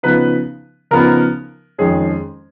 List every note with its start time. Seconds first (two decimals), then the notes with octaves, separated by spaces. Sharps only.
0.03 C#3 F3 B3 D#4 B4
0.91 C#3 F3 B3 D#4 A#4
1.78 F2 D#3 G#3 C#4 G#4